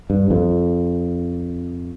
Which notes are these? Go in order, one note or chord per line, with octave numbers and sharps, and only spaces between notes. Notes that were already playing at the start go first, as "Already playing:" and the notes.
G2
F2